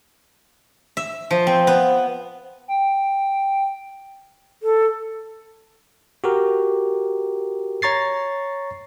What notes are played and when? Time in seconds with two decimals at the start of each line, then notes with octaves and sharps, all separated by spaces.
0.97 E5
1.31 F3
1.47 C4
1.67 B3
2.68 G5
4.63 A4
6.24 F#4 G4 A#4
7.82 C#5 A#5 C#6 A6 C7